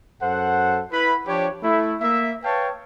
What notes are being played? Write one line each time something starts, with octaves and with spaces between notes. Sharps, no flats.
F#2 A4 C5 F#5
E4 B4 B5
F3 D4 G4 C#5
A3 E4
A#3 E5
B4 C#5 F5 G5 A5